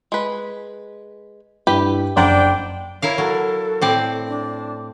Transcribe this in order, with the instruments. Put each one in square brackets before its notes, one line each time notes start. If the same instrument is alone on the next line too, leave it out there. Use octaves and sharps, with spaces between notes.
[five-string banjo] G#3 B4
[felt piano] G2 E4 [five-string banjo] G4 B4 G5
[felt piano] F#1 [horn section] D4 D5 G5 [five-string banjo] C5 F#5 A#5
[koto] E4 A#4 F5 [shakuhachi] C#5
[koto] F#3 [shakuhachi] A4
[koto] A2 C4 D5
[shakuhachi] D4